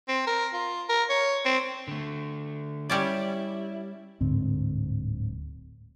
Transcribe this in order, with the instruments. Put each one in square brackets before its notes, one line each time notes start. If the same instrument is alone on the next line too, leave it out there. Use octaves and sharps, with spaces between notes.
[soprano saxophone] C4
A#4
F4
A#4
C#5
C4
[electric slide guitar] D3 A3
[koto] G3 C#4 D5 [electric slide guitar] E4
[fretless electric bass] D1 G#2 D3 C4